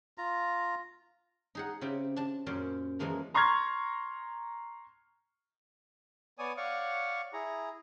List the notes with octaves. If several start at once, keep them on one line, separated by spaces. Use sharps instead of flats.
F4 A#5
D#4 G#4 F#5
C#3 C4 E4 G4
D4 A5
F#2 A#2 C#4 C5 D5
F#2 E3 F3 G#3 A#3 A#5
A#5 C6 C#6 F6 G#6
B3 C#5 D5 G#5 D#6
C#5 D5 F5 F#5 C#6
E4 G#4 A#5